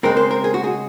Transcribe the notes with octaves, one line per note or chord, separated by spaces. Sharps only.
C#3 G#3 C4 A#4
C5
A#4
G#4
F#4
G#4